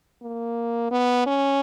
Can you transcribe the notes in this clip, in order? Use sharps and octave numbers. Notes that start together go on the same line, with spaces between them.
A#3
B3
C#4